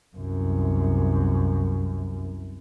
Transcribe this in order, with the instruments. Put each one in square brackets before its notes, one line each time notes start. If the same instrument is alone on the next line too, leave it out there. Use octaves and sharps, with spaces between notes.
[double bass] C2 F#2